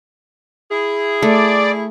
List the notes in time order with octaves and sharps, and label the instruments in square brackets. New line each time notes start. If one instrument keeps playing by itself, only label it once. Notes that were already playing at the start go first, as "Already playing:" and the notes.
[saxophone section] E4 G#4
[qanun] A3 [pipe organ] D5